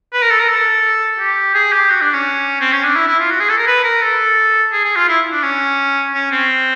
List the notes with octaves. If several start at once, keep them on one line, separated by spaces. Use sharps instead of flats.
B4
A#4
A4
A#4
A4
G4
G#4
G4
F#4
D4
C#4
C4
C#4
D4
E4
E4
F4
F#4
G#4
A4
A#4
B4
A#4
A4
G#4
G#4
F4
E4
D4
C#4
C#4
C4